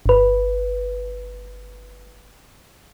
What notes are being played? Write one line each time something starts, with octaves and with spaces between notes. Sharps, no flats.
G1 B4